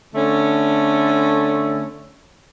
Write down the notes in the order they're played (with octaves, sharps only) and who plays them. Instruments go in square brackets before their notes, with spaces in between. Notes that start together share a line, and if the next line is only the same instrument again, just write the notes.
[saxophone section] D3 A3 C#4